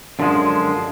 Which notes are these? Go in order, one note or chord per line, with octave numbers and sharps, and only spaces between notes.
F#2 D3 F3 G#3